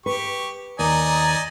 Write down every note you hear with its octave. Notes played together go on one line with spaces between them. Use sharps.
G4 B4 C#6
D#2 D5 D#5 G#5 A#5